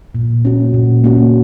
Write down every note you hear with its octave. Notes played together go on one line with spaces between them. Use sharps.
A#2
A#3 C#4 F#4
A#2
A#3 C#4 F#4